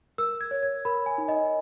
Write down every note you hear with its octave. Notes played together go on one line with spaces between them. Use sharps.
A#4 E6
G#6
C#5
G#6
A#4 B5
G#5
D#4
D#5